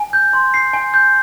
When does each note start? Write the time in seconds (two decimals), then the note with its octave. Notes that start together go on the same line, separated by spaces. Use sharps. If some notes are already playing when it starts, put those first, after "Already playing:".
Already playing: G#5
0.13 G6
0.33 C6
0.54 C7
0.74 G#5
0.94 G6